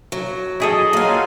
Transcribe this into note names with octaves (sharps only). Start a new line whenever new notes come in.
F#3
E4 G#4 A4 D#5
F#3 A3 A#3 F4 G#5